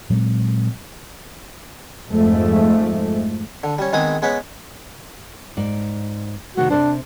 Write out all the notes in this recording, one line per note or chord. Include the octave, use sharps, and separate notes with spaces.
A#2 F#3 G#3 C4
F2 G#2 F3 G#3 A3
D3
G3 C#4
D#3 G#3 B3 C4 G#4 D#6
G#3 B3 C#4 B4
G#2 D5
C3 D#3 A3 F#4
C3 D4 A4 C5